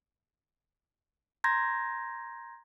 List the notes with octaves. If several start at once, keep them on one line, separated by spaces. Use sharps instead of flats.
A#5 C6 G6 G#6 A#6